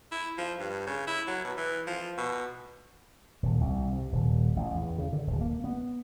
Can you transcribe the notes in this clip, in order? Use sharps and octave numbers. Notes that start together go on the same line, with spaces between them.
E4
F3
G2
C#3
E4
F#3
B2
E3
F3
B2
D#1
C2
C3
D#1
A1
E2
C#3
D3
D1
A#3
B3